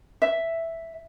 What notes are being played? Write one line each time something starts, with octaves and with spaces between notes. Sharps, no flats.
E5